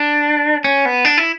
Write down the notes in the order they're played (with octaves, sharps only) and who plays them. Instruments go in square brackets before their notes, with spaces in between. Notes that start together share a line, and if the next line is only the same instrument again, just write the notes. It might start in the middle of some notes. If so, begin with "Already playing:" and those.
Already playing: [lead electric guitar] D4
C#4
B3
D4
E4